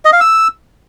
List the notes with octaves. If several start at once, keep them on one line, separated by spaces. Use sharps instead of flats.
D#5
F5
E6